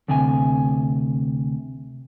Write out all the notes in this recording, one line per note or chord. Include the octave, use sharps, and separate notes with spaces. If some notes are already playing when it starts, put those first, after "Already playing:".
D2 C3 G#5